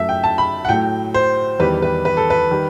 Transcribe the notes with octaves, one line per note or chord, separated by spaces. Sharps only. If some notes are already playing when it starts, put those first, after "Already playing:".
Already playing: F#2 F#3 A3 E5
G5
A5
B5
F#5
A2 F#3 A3 G5
C5
E2 D#3 G3 B4
B4
B4
A4
B4
D#3 G3